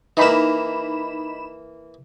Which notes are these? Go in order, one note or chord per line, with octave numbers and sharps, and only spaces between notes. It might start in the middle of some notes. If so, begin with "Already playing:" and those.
E3 A#3 D#4 B5 E7